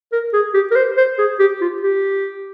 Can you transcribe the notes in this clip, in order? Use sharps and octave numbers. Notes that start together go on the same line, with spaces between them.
A#4
G#4
G4
A#4
C5
C5
G#4
G4
F4
G4